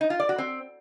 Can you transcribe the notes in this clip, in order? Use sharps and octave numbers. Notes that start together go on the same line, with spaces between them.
D#4
F4
D5
F#4
C4